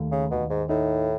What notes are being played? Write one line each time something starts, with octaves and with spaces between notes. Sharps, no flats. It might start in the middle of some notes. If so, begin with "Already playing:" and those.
Already playing: D#2 A3
C#3
D#2 B2
G#2
A2 D#4